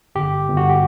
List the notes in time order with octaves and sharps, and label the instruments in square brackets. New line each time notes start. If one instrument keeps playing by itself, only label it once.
[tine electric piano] G1 G4
G1
F#4
G4